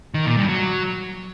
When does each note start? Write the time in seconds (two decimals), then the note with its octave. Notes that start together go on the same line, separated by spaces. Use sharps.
0.14 D#3
0.26 A#2
0.37 G2
0.49 F#3